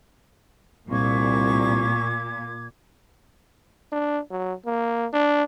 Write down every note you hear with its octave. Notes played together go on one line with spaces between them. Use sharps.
C2 A#2 C#6 D6 G#6
D4
F#3
A#3
D4